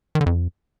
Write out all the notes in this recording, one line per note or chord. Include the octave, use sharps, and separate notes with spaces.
D#3
D3
F2